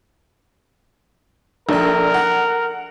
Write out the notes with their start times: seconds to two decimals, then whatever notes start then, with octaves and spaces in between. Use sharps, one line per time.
1.69 A#1 D4 A4 A#4
2.14 F#5